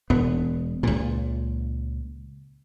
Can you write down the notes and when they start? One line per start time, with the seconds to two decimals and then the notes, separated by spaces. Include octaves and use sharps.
0.10 E1 B3
0.83 C#2 A#2